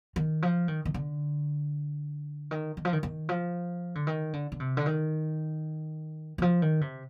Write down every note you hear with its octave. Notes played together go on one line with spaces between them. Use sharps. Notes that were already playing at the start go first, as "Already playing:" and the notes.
D#3
F3
D#3
D#3
D3
D#3
D#3
F3
D#3
D#3
F3
D3
D#3
D3
D3
C3
D3
D#3
D#3
F3
D#3
C3